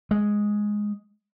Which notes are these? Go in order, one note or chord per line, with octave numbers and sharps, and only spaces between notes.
G#3